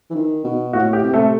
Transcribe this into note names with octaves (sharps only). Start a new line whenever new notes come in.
E3
D#3
B2
A2 F#4
G4
C3
A3 A4